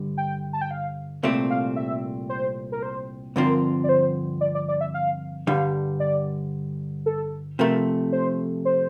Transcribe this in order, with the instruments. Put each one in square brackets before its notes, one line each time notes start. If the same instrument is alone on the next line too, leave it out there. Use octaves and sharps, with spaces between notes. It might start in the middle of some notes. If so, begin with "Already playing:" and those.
Already playing: [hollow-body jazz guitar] G2 D3 G3
[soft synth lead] G5
A5
G5
F5
[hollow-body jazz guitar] C2 A#2 A3 C4
[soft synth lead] F5
E5
C5
A#4
C5
[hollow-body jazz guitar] G2 D3 F3 C4 F4 [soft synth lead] A#4
[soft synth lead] D5
C5
D5
D5
D5
E5
F5
[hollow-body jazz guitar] G2 D3 G3 [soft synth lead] F5
[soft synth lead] D5
A4
[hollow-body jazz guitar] C3 F3 A3 [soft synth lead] A#4
[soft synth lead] C5
C5